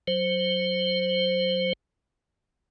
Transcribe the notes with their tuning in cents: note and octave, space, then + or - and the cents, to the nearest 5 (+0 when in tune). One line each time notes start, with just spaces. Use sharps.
F#3 +0 C5 +0